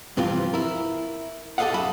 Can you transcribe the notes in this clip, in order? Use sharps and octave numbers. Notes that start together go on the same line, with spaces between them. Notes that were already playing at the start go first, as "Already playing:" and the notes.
G2 C3 E3 F3 C4 F4
E4 A#4
G4 A4 C5 D#5 F5 F#5
F#2 E5 A5 B5